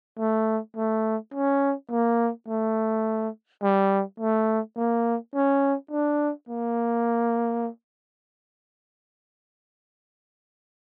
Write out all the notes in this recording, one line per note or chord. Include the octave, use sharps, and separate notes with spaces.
A3
A3
C#4
A#3
A3
G3
A3
A#3
C#4
D4
A#3